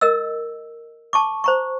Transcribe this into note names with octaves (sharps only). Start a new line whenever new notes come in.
A#4 D#5 E6
A5 C#6 D6
C5 A#5 C#6